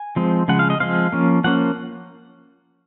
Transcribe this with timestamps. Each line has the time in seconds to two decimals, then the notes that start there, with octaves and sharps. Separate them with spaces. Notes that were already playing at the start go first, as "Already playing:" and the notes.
Already playing: G#5
0.16 F3 G#3 C4
0.48 C#3 F3 G#3 F#5
0.59 F5
0.70 D#5
0.80 F3 G#3 C4 F5
1.12 F3 A#3 C#4
1.44 F3 A#3 C#4 F#5